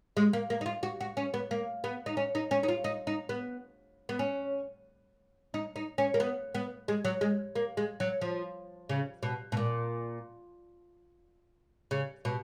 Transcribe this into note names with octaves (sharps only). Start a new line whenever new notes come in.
G#3
A#3
A#3
D#4
F4
F#4
F#4
C#4
B3
A#3
B3
D#4
C#4
D#4
C#4
D#4
F4
D#4
D#4
B3
B3
C#4
D#4
D#4
C#4
A#3
B3
B3
G#3
F#3
G#3
A#3
G#3
F#3
F3
C#3
B2
B2
A#2
C#3
B2